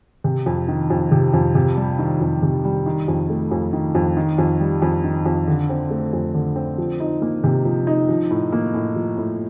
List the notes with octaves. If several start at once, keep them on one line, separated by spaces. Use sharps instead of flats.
C3
F2
D#3
F2
C3
F2
C3
G3
D#3
F2
C3
G3
D#3
F2
A3
F2
D#3
F2
D#3
F2
G3
F2
D#3
F2
D3
C4
A3
F2
D3
C4
F3
D#4
A#3
C3
F3
D#4
F3
A2
A#3
A2
F3
A2